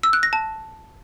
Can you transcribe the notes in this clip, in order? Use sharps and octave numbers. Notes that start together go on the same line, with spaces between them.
E6
F#6
A#6
A5